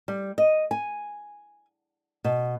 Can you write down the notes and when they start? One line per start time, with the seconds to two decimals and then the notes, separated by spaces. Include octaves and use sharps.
0.08 G3
0.38 D#5
0.71 G#5
2.24 B2